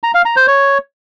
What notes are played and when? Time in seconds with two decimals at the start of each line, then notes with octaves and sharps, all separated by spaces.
0.03 A#5
0.14 F5
0.25 A#5
0.36 C5
0.47 C#5